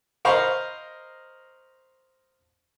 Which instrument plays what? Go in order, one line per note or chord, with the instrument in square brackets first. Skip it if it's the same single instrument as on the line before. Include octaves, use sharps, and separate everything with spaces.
[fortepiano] A#4 C5 D#5 F5 B5 C#6